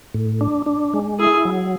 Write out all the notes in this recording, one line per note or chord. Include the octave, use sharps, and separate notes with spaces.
A2
D4
D4
G#3
E4 G#4
F#3